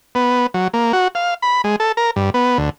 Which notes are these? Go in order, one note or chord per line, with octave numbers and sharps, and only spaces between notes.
B3
F#3
A#3
F#4
F5
B5
G#3
A4
A#4
G2
B3
D2